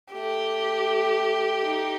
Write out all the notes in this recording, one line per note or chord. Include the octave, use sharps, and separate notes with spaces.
A3 G4
D#4